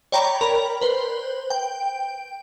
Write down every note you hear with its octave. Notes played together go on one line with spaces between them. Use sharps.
C#5 D5 G5 A#5 B5
A#4 B5
B4 C5
G5